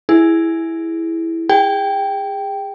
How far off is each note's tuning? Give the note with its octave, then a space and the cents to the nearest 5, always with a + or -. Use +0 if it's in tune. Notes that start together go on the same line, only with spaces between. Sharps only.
E4 +0 G#4 +0
G#4 -30 G5 +0